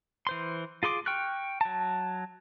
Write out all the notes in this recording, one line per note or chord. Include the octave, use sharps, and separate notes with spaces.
E3 C5 C6
F4 G#4 C6 D6
G5 C#6 F6 F#6
F#3 A5